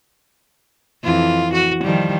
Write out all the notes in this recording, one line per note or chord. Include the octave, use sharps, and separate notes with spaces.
F2 E3 F4
F#4
D#3 F3 G3